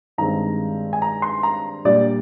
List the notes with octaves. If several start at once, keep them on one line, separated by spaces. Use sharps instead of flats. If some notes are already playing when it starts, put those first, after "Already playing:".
G2 D#3 G#3 C4 A#5
G#5
A#5
C6
A#5
A#2 G3 D4 D5